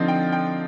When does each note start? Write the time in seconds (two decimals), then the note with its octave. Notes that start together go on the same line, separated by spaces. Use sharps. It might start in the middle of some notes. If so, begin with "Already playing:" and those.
Already playing: D3 F3 C4 D#4
0.08 G5
0.32 G5